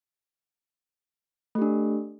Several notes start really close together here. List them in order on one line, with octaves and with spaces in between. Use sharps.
A3 G4 D4